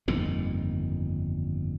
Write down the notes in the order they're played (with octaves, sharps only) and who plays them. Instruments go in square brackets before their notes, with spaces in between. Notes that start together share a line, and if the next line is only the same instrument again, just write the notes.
[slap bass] G1 F2 A#2 D#3